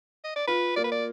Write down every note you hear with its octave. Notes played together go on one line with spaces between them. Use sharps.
D#5
D5
F4 B4
A#3 D5
B4
D5